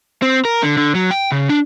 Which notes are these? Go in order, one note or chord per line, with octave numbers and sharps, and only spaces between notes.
C4
A#4
D3
D3
F#3
G5
C#3
D4